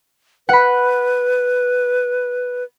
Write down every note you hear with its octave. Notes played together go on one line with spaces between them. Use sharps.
B4 F#5 B5